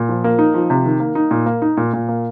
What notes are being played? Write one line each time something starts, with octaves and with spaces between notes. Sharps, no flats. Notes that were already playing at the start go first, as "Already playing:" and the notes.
Already playing: A#2
F3
A#3
D#4
F3
C3
D#3
A#3
D#4
A#2
A#3
D#4
A#2
A#2
A#3